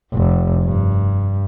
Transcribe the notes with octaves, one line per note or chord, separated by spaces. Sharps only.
F1
G2